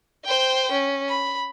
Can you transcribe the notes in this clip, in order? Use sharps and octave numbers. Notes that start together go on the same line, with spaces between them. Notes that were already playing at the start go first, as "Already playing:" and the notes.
C5 G5
C#4
B5